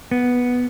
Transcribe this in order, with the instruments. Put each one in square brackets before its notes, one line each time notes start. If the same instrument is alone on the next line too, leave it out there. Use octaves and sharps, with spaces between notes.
[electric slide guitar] B3